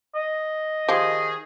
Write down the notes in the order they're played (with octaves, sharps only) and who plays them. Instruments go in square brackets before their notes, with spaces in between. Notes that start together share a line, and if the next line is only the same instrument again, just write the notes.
[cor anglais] D#5
[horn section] D#3 G#4 [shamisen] F3 G4